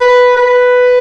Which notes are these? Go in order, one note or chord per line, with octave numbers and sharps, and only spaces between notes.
B4
B4